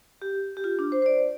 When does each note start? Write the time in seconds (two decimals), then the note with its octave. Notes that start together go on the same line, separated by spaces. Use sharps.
0.22 G4
0.57 G4
0.64 F4
0.79 D4
0.92 C5
1.02 C5
1.06 D5